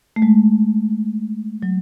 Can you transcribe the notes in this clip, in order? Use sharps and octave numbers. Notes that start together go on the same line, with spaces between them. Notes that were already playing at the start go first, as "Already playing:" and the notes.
A3
G#3
F#3